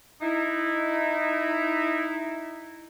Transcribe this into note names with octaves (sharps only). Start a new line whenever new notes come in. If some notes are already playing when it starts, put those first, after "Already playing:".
D#4 E4